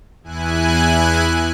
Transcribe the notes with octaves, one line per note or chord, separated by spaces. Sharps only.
E2 E4 G#5 F#6